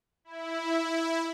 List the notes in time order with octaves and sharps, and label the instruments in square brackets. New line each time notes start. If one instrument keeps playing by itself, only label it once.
[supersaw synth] E4